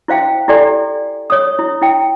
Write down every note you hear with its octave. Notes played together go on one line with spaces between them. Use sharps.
E4 C5 F5 G5
E4 G4 A4 D5 G#5
C#5 D#6
E4
E4 G5